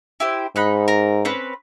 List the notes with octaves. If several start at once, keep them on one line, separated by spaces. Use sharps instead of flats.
E4 G4 C5
G#2 D#4 B5 F#6
A#4
C4 C#4 B4